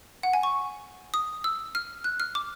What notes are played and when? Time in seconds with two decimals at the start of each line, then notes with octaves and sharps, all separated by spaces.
0.23 F#5
0.33 G#5
0.43 C#6
1.14 D#6
1.44 E6
1.75 F6
2.04 F#6
2.20 F6
2.35 D6